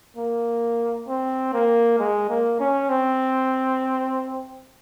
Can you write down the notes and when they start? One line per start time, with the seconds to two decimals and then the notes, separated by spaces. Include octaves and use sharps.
0.17 A#3
1.08 C4
1.53 A#3
1.99 G#3
2.29 A#3
2.60 C#4
2.90 C4